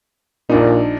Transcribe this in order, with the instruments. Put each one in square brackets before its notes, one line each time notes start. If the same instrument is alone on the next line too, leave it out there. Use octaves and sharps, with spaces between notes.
[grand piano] A#1 D4 D#4 [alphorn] A#2